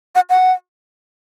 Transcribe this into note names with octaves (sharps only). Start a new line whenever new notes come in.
F#5
F#5